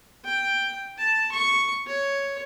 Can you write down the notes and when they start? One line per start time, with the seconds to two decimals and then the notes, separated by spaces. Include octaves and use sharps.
0.25 G5
0.98 A5
1.32 C#6
1.87 C#5